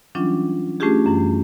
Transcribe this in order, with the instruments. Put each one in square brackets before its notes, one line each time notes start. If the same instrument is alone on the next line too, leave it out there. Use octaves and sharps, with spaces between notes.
[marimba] E3 F#3 G3 C#4 D4 F4
A3 C#4 D4 F4 G4 G#4
F#2 E3 G3